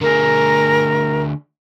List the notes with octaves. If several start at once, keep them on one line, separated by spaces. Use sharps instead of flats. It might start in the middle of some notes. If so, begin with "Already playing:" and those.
D3 A3 G#4 A#4 A#5